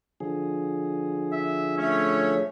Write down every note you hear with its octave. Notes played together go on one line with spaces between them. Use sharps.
D3 F3 G#4
E5
A3 C#4 C#5 E5